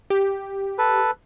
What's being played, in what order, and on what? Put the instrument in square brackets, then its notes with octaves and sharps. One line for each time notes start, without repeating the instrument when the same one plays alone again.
[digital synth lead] G4
[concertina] A4 B4